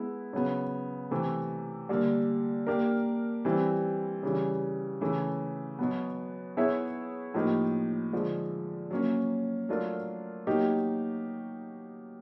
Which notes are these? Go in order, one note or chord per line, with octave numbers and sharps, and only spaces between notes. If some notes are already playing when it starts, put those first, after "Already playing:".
Already playing: G#3 B3 E4
C#3 F#3 B3
C3 E3 A3
D3 G3 A#3
A#3 D4 G4 A#4
E3 G3 C4 E4
C#3 E3 G3
C#3 E3 A3
B2 F#3 B3
B3 E4 G#4 C#5 E5
A2 F3 A#3 D#4 G4
D3 F3 G#3
F#3 A#3 C#4
F#3 A3 D4 F4 A#4
B2 F#3 A#3 D#4 G4